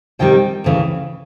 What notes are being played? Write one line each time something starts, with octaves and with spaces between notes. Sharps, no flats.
C3 D#3 G3 G5
D2 C#3 E3